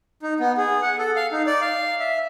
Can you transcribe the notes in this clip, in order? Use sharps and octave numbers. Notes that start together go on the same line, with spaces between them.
D#4
B3
G#4
F#5
A4
F5
D#4
D5
F5
E5